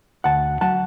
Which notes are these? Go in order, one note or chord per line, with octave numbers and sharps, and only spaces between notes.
D2 F#5 A5
F#3 F#5 A5